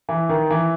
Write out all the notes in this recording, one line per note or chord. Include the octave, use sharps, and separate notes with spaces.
E3
D#3
E3